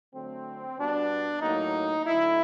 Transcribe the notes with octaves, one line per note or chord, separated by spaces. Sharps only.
D3 F#3 A3 C4
B2 G3 B3 D4
A2 F#3 A#3 D#4
D3 F#3 A3 E4